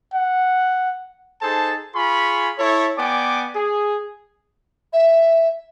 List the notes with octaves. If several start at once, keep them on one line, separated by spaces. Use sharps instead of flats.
F#5
D#4 G#4 A4 C5 A5
F4 G#4 G#5 B5 C#6
E4 A4 C#5
B3 D5 G5 G#5 D6
G#4
E5